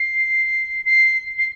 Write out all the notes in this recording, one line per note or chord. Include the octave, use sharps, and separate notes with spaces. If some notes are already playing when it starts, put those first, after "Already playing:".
Already playing: C7
C7
C7